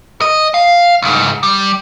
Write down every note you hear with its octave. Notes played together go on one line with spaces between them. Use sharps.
D#5
F5
C#2 G#2
G3